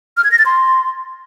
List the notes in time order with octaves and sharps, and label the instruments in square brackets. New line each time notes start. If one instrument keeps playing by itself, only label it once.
[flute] F6
G#6
A#6
A6
C6